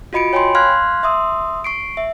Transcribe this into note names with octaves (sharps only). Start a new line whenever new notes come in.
F4 F#4 D#5 B5 C#7 D7
C#5 G5 G#5 B5 C6
F5 C6 F6 F#6 G#6
E5 C6 D#6 E6
C#6 C7 D7
E5